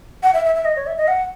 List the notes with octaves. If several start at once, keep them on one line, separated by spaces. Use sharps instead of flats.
F#5
E5
E5
E5
D#5
C#5
E5
D#5
F#5